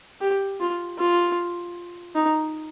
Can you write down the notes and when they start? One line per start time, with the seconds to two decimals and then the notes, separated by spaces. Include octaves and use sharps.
0.21 G4
0.60 F4
0.98 F4
2.16 D#4